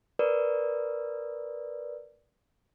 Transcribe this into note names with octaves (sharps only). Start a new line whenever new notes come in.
A#4 B4 D5